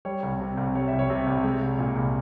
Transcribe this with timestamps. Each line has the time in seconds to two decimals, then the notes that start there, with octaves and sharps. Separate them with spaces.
0.05 G3 C#5
0.23 C2
0.40 C3
0.57 C2
0.75 G3 C#5
0.88 E5
0.93 C2
0.99 C#5
1.10 C3
1.27 C2
1.44 G#3
1.62 C2
1.79 A#2
1.96 C2